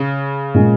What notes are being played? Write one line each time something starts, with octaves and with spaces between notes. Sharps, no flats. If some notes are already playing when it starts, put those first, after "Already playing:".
Already playing: C#3
A#2 G#3 C#4